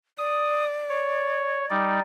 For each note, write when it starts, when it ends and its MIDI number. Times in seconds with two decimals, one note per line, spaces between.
0.18 1.70 74
0.18 0.64 87
0.89 1.65 73
1.70 2.00 55
1.70 2.00 63
1.70 2.00 74